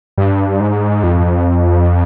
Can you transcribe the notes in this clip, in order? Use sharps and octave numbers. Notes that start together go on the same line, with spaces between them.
G2
G#2
F2